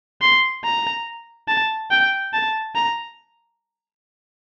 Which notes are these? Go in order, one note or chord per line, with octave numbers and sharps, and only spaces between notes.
C6
A#5
A5
G5
A5
A#5